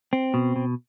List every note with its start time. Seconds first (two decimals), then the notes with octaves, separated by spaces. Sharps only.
0.13 C4
0.34 B2
0.56 B2